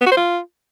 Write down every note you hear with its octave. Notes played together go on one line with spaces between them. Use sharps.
B3
F#4
C5
F4